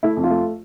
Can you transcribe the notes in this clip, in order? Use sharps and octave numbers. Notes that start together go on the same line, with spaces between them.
A3 E4
F2
F4
A3